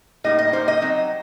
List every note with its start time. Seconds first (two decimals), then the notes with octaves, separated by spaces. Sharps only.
0.24 A2 G3 A#3 D#4 D#5
0.39 D#5
0.52 A2 G3 A#3 D#4 C5
0.68 D#5
0.82 F#3 C4 D#4